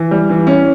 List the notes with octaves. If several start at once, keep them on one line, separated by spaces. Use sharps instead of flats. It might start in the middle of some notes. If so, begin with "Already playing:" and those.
Already playing: E3
G3
E3
C#4